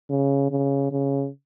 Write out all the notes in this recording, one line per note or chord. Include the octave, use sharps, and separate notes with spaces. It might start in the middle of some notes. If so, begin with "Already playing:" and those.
C#3
C#3
C#3